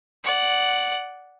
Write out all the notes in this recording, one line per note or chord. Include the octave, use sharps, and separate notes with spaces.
D5 F#5